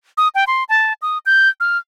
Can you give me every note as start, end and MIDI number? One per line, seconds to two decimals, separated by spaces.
0.18 0.28 87
0.35 0.44 79
0.47 0.64 84
0.69 0.93 81
1.02 1.18 87
1.26 1.49 91
1.60 1.78 89